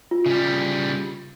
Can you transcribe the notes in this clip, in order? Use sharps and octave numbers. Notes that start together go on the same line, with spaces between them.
F4
C#3 G3